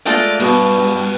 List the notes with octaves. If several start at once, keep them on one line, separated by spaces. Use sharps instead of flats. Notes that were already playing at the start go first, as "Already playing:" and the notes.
G#3 A3 F4 D5
G2 B2